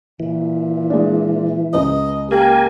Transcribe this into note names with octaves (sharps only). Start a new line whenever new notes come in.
A#2 E3
G#3 D4
C#2 B4 D#5
A#3 G4 A#4 G#5